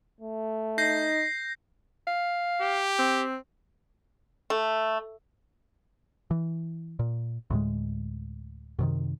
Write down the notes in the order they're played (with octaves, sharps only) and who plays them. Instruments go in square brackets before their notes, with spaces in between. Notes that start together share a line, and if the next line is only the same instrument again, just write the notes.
[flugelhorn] A3
[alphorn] D#4 [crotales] G6 A#6 C7
[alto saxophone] F5
[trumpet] G4
[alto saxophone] C4
[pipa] A3
[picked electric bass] E3
A#2
D2 A2 G#3
F#2 C3 D#3